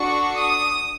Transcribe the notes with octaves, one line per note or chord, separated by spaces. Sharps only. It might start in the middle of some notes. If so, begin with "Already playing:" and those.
Already playing: D4 F#4 A4 C#6
D#6